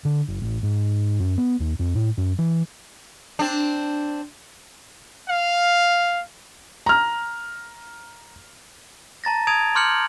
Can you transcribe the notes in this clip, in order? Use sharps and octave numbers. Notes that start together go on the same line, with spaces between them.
D3
F#1
A1
G#2
F#2
B3
D#2
F2
A2
F#2
E3
C4 D4
F5
A#5 F6
A5 A#5 A6 A#6
A5 D#6 G#6 D7 F7
C6 D6 F6 G6 C#7 F#7